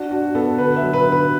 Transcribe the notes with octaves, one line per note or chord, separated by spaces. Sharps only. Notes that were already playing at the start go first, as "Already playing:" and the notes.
Already playing: D4 F#4
D4 F#4
B3 A4
D3 B4
E5
F#3
B4
D3
B4